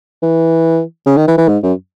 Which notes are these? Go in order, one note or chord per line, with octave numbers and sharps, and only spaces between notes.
E3
C#3
D#3
E3
E3
G#2
F#2